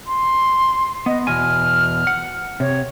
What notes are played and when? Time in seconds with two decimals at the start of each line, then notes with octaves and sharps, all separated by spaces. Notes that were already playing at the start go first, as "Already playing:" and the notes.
0.07 C6
1.06 B3 D#5
1.27 E2 B2 G#5 F6
2.07 F#5
2.60 C3 C#5